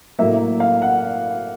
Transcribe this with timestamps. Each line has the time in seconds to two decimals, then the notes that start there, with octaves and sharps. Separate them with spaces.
0.19 A2 F#3 A#3 E5
0.60 F5
0.82 F#5